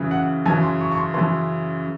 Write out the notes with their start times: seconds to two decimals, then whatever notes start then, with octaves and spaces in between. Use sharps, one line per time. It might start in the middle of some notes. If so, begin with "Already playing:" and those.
Already playing: F#2 C#3 E3
0.11 F#5
0.46 F#2 C#3 E3 G#5
0.63 C6
0.80 C#6
0.91 C#6
0.98 C6
1.14 F#2 C#3 E3 C6